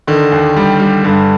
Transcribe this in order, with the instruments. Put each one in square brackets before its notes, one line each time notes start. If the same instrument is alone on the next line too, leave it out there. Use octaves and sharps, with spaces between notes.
[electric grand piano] D3 [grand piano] D#3
[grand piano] D#2
G3
G3
[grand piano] G2 [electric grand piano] D3